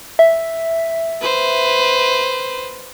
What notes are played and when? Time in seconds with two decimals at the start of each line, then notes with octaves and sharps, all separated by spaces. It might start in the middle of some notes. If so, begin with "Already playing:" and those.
0.19 E5
1.21 B4 C5